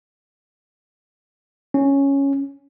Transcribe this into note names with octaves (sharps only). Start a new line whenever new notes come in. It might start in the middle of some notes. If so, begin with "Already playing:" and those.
C#4